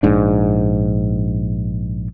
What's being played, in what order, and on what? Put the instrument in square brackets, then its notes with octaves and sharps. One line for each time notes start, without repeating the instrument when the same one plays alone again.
[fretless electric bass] A#1 G#2 D4